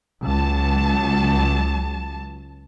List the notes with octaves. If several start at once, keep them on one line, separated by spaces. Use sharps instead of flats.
C#2 F#3 A5